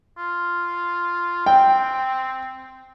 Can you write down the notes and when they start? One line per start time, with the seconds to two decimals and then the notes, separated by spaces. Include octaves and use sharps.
0.18 F4
1.46 C4 G5